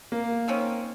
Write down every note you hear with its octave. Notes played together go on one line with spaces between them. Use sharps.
A#3
D#3 C4 C#4